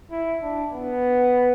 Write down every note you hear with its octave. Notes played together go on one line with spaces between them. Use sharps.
E4
D4
B3